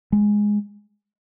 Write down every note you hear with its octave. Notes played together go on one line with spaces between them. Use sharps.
G#3